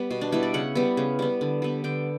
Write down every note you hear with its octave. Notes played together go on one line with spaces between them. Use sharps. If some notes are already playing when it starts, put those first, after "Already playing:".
Already playing: G3 B3
B2
D4
G3 B3 E4
D5
C#3 F#5
G3 B3
C#3
G3 B3
D3
G3 B3
D3 G5